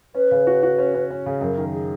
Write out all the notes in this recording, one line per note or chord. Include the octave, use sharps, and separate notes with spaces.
C#4 B4
C#3
F#4
F#4
C#4
C#4
C#4
C#3
F#2 A#4
D#3
G#4